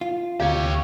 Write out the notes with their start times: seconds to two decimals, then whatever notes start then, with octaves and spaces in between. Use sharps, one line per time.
0.01 F4
0.40 D2 C3 G4 C#5 F5 G#6